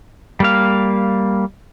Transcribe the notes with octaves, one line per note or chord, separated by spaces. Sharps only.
G3 A#3 F5